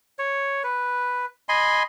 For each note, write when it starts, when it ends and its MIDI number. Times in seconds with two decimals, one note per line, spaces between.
0.19 0.63 73
0.63 1.26 71
1.49 1.83 75
1.49 1.83 80
1.49 1.83 83
1.49 1.83 84